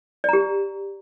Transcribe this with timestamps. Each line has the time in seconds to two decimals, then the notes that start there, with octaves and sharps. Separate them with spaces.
0.24 D5
0.29 A#5
0.33 G4